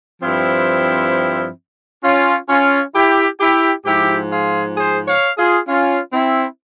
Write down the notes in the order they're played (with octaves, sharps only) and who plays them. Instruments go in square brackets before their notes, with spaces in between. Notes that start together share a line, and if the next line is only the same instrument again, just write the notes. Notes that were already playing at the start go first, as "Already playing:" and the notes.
[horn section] G2 F3 C4 E4
C#4 F4
C#4 F4
E4 G4
E4 G4
G#2 F3 E4 G4
F4 G#4
G#4 C5
C#5 F5
F4 G#4
C#4 F4
C4 E4